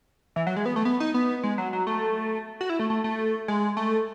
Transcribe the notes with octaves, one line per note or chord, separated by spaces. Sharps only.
E3
F#3
G#3
B3
A3
B3
D#4
B3
G#3
F#3
F#3
A3
F#4
E4
A3
A3
A3
G#3
A3